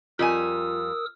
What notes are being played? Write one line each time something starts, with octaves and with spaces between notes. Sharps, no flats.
F2 G3 F4 A#4 G#5 D#6 E6